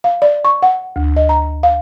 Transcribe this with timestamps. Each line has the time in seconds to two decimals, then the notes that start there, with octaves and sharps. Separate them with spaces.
0.04 F5
0.22 D5
0.45 C#6
0.62 F#5
0.96 D2
1.16 D#5
1.29 A#5
1.63 F5